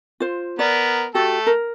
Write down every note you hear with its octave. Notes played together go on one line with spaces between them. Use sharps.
F4 C5
B3 A#4 D5
A3 F#4 G4 A4
A#4